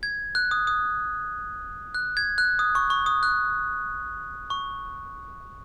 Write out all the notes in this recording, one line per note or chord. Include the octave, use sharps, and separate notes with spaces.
G#6
F#6
D#6
D#6
F#6
G#6
F#6
D#6
C#6
C#6
D#6
F#6
C#6